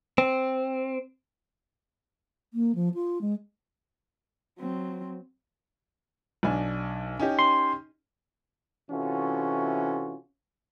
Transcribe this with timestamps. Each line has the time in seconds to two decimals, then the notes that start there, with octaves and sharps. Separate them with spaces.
0.18 C4
2.54 A#3
2.75 F3
2.94 F4
3.21 G#3
4.59 F#3 C4
6.43 B1 D4 G#5
7.20 C#4 D#4 G4
7.39 C6
8.90 C3 E3 C#4 F4 F#4 A4